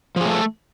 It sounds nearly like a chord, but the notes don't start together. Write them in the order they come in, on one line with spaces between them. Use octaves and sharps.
F3 G#4 A3 A4